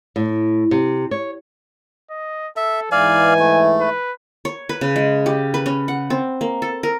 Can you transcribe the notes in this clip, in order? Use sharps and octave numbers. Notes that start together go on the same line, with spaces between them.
A2
C3
C#5
D#5
A4 E5
G#2 E3 D5 F5 G#5
A3
B4
C#5
B4
C#3
G#3
G4
B4
C#4
F#5
C4
A#3
A4
A#4